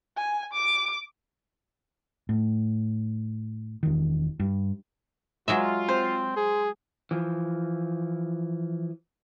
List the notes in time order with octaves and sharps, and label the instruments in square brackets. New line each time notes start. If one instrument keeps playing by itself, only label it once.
[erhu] G#5
D6
[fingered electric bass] A2
E1 D#3
G2
[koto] F#3 G#3 E5 [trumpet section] F4
[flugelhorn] C4 [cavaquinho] C5
[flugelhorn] G#4
[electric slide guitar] E3 F3